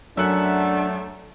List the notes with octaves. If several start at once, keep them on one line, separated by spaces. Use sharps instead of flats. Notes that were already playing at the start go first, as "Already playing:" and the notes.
F#2 A3 D4 E5 F#5